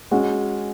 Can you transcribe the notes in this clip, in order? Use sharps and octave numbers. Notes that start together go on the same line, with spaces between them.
G#3 C#4 F#4